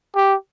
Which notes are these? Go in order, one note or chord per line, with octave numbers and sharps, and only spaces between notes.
G4